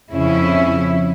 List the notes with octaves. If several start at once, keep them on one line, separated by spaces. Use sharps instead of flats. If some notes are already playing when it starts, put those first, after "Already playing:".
F2 C#3 C#4 E4